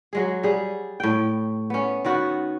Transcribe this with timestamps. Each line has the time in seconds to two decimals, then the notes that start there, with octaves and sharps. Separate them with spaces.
0.13 F#3 G#3 G#4
0.43 G3 G#4
1.00 A2 G5
1.70 B3 C#4
2.05 D#3 B3 F#4